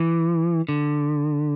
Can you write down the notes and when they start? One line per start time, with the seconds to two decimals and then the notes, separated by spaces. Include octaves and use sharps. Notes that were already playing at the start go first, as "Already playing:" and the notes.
Already playing: E3
0.69 D3